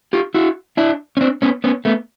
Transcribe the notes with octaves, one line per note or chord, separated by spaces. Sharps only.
F4 G4
E4 F#4
D4 E4
C#4
C4 D4
B3 C#4
B3 C#4
A3 B3